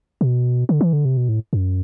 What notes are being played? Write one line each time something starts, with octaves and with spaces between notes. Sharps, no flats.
B2
D3
E3
D3
C3
B2
A2
F#2